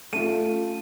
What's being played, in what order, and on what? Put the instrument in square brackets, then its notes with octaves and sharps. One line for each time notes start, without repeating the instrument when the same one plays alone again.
[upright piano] A3 C#4 F4 [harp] D#7